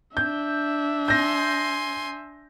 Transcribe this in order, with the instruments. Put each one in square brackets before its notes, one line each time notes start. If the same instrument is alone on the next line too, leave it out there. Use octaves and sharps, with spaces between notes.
[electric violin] D4 E5 [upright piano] G6
[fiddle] G#5 C6 [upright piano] G6 A#6